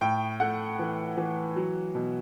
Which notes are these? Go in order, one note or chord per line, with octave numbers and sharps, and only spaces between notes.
A2 G5
A3 F#5
E3
E3
F#3
B2